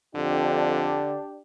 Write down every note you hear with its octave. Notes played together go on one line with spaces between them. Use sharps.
F2 D3 D4 G4